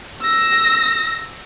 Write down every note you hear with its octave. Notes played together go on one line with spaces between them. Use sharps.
E6 A#6